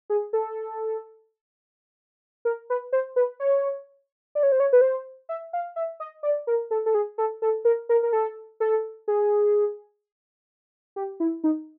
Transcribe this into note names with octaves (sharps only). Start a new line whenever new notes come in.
G#4
A4
A#4
B4
C5
B4
C#5
D5
C#5
C5
C#5
B4
C5
E5
F5
E5
D#5
D5
A#4
A4
A4
G#4
A4
A4
A#4
A#4
A#4
A4
A4
G#4
G4
E4
D#4